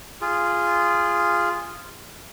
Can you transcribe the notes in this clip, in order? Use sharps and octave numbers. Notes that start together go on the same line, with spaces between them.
F4 G#4